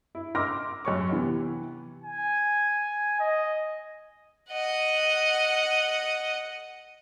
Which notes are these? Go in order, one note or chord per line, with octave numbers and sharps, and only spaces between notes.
E4
C6 D6 E6 F6 A#6
F#2 C#5 C#6
C3 E3 B3
G#5
D#5
D#5 F#5